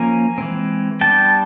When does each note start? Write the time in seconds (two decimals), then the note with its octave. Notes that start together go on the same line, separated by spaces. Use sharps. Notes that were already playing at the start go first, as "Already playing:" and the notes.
Already playing: F3 A#3 C#4 G#5 A#5
0.38 E3 G#3 C4
1.01 G3 B3 D4 G5 A5